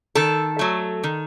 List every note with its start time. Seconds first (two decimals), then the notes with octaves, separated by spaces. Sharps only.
0.15 D#3 A4
0.59 F#3 A3
1.04 D#3